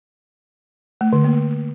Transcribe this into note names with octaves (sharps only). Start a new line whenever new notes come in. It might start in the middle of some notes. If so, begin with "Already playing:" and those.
A3
D3
A#3